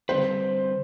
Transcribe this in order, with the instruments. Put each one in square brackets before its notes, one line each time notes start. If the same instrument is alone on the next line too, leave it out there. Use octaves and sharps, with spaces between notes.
[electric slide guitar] D3 G3 C4 G4 B4 [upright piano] C5